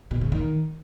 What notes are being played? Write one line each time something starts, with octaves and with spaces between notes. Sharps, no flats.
B2
C#3
D#3